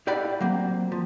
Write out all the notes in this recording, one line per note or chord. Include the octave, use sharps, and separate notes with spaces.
E4 G4 D5 F5 F#5 B5
F#3 A#3 C4
F3